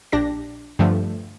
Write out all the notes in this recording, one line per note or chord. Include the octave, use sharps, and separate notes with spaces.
A#1 D4 G4 A#6
G2 D3 F3 A3